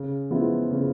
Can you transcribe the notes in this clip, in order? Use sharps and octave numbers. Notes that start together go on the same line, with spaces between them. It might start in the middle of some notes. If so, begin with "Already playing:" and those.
Already playing: C#3
F3 G#3 B3 E4
C#3